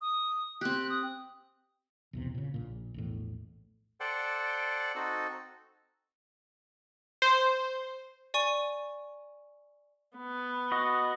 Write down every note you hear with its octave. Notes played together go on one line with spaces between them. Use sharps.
D#6
C4 G4 F#6
D#6
B1 E2 C3
A#2 C#3
A#1 A#2
A#1 E2 A2
A4 C5 D5 F#5 G5
C4 D#4 F#4 A4
C5
D5 G#5 C#6 D#7
B3
F#4 D#5